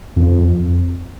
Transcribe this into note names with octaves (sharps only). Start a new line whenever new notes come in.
F2